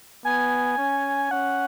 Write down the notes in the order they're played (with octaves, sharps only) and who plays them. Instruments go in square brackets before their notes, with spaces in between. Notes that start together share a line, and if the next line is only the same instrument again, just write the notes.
[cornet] B3 [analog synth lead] G#5
[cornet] C#4
[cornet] C#4 [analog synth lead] F#5